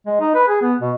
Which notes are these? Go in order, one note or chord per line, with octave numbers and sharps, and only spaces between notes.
G#3
D#4
B4
G#4
B3
B2